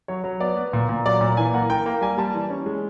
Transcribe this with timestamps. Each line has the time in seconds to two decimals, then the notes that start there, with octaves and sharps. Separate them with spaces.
0.08 F#3 C#5
0.24 F#3
0.40 B3 D5
0.57 B3
0.73 A#2
0.89 A#2
1.06 F#3 D5
1.21 A#2
1.37 E3 G#5
1.54 A#3 F#5
1.70 A#3 G5
1.86 A#3
2.01 G3 G#5
2.18 G3 A5
2.34 E3
2.50 C#4
2.66 G#3